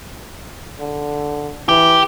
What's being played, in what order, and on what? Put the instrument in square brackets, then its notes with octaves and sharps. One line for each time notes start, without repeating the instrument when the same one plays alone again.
[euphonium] D3
[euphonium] E3 [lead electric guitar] G4